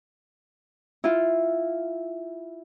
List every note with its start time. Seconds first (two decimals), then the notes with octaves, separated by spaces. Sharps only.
1.04 E4 F4